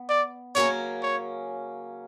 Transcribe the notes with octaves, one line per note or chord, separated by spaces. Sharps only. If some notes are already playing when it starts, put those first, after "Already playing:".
Already playing: B3
D5
C#3 F#3 A#3 C#4 C#5
C#5